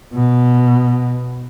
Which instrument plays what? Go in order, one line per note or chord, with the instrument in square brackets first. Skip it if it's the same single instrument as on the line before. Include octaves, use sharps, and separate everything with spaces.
[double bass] B2